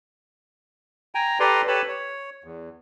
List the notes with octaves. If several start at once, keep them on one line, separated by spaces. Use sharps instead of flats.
G5 G#5 A#5
G4 A4 B4 D5 A#5 C6
G4 A4 B4 C#5 A5 B5
C#5
E2